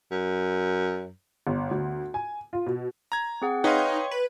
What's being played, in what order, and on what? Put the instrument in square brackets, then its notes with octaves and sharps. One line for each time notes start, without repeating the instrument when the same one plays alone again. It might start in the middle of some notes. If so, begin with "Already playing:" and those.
[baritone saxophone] F#2
[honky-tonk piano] G1
D2
G#5
F4
B2
[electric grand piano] A#5 G#6
[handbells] C4 G#4 F#5
[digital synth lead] D#4 [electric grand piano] B4 D#5 F5 [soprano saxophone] C#5 [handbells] G5 C6
[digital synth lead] B4